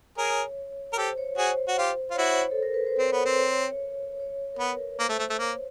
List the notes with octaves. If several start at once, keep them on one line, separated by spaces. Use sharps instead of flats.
G#4 A#4 C#5
A#4
G4 A4 C5
C#5
F#4 G#4 C5
F#4
F4 G4
F4 C#5
E4 F#4 C5
A4
A#4
B4
C5
C4 C#5
B3
C4
C#5
C#5
A#4
B3 B4
A#3 C5
A3
A3
A3
A#3 C#5